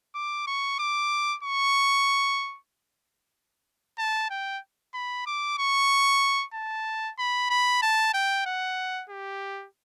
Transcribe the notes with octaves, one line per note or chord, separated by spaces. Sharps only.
D6
C#6
D6
C#6
A5
G5
B5
D6
C#6
A5
B5
B5
A5
G5
F#5
G4